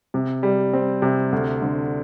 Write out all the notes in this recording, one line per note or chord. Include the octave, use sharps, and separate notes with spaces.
C3
G3
C4
C3
D2
D3